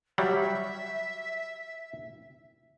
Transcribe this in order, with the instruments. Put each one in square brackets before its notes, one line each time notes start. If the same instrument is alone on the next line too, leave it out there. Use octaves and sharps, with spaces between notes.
[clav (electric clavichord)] F#3 G3 [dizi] E5